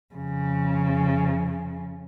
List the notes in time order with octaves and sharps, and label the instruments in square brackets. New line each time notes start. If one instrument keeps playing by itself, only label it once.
[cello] F2 C#3